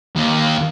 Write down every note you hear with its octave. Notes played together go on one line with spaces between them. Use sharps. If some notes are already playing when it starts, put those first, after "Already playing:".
D#2